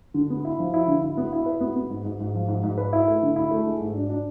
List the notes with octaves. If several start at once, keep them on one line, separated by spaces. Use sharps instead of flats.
D3
B3
E4
F3
E4
D3
E4
B3
E4
B4
B3
B3
G#2
G#2
G#2
F3
G#2
G#2
B4
E4
A3
D3
E4
A3
G#3
G#2
D4
D4